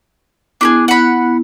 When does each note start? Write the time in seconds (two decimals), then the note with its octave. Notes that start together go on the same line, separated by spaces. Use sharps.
0.61 B3 D4 E4 G4 G#4
0.88 F#5 B5